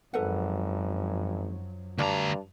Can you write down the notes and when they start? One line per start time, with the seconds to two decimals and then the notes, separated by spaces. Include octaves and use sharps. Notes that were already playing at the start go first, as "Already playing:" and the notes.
0.14 G#1 F#2 F3 F#3 A4 B4 F#5
1.98 D2 G2 D5 A5 A#5